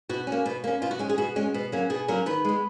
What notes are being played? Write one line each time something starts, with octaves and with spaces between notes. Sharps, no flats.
B2 F#4
C#4
A#3
B2
A#3 C#4
B2 F4
F#4
G#3 C#4
G#4
B2 F#4
G#3 C#4
B2
F#3 A#3 C#4
B2 G#4
F#3 A#3 C#4 A#4
D#3 B4
G#3 B3